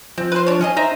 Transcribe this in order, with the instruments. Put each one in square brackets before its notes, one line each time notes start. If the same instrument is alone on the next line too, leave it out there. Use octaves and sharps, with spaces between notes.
[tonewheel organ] F3 [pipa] C4
[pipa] B4 C5
D4 C#5
C#4 G#4 D#5
[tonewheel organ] D#4 C5 [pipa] D#5 E5 A#5